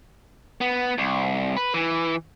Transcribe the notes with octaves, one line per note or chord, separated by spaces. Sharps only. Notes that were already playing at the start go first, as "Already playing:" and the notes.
B3
C2
B4
E3